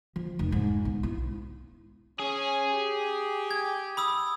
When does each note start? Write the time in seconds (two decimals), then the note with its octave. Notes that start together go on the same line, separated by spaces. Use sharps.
0.16 F3
0.39 F1
0.52 G#2
0.85 B1
1.03 E4
2.19 C#4 G#4
2.71 G4
3.51 G#6
3.97 B5 D#6 E6